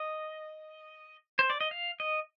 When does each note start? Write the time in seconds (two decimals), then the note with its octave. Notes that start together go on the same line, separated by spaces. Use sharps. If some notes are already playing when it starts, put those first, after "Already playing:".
Already playing: D#5
1.39 C5
1.50 D5
1.61 D#5
1.71 F5
2.00 D#5